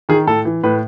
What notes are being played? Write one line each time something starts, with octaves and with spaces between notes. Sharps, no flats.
D#3 G#4
A2 A4
E3
A2 B4